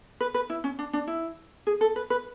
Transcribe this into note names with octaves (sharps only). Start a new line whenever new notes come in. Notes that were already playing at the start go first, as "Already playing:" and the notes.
B4
B4
E4
C#4
D4
D4
E4
G#4
A4
B4
B4